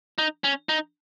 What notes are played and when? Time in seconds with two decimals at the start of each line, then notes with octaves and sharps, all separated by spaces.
0.18 D#4
0.44 C#4
0.69 D#4